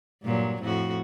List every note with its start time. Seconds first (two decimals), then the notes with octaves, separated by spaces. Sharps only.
0.23 G2 A#2 F#3
0.60 F2 A2 F#4